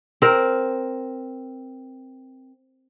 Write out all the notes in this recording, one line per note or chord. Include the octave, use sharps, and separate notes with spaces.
C4 A#4